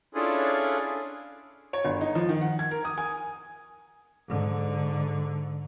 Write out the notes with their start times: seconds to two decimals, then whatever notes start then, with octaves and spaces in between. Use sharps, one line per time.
0.15 C#4 D4 E4 F4 G#4 A4
1.73 C#5
1.85 G1
2.01 D#4
2.15 F3
2.29 D#3
2.41 F#5
2.59 G#6
2.71 A#4
2.85 D#6
2.98 G#5
4.28 G#2 D3